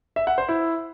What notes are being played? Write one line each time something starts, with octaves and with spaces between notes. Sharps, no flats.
E5
F#5
C5
E4